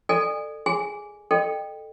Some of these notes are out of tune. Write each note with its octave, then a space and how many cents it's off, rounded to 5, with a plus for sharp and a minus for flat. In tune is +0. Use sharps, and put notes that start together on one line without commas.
A4 +10 D5 +35 G#5 -30
G#4 +0 G#5 +0
A4 +0 D#5 -30 G5 +5